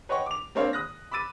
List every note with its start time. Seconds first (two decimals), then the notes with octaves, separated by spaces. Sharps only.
0.09 B4 C#5 D#5 F#5 G5 C#6
0.26 D6 F7
0.55 A#3 C4 D4 C#5 F5
0.73 D#6 F#6 A#6
1.11 B5 D6 E6 A6 D#7